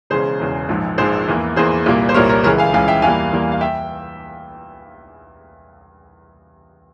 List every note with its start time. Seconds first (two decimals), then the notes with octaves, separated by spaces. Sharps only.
0.10 E1 E2 C#3 G#4 C5
0.39 E1 E2 C#3
0.69 A#1 G#2 F3
0.98 A#1 G#2 F3 G#4 C5
1.28 E2 E3 A#3
1.56 E2 E3 A#3 G#4 C5
1.86 C2 A#2 G3 A#3
2.09 C5
2.14 C2 A#2 G3 A#3 A#4 C#5
2.29 A#4 C#5
2.44 C#2 C#3 E3 G#3 A#4 C#5
2.58 F5 G#5
2.73 C#2 C#3 E3 G#3 F5 G#5
2.88 E5 G5
3.02 E2 E3 G3 A#3 F5 G#5
3.32 E2 E3 G3 A#3
3.52 F5
3.61 E5 G5